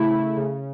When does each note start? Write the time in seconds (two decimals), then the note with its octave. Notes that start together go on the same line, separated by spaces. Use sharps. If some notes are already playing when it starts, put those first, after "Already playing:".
Already playing: C#3 A3 E4
0.10 A3
0.37 C#3